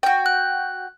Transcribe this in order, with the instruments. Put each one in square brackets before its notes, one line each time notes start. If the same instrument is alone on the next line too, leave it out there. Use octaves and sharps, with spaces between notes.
[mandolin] F#4 G5
[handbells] F#6